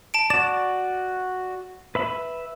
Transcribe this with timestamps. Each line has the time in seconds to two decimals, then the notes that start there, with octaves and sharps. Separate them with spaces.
0.14 A5 D7
0.30 F#4 D5 E7
1.95 B4 E5 B5